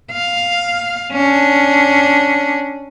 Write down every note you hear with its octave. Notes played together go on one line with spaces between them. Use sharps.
F5
C#4 D4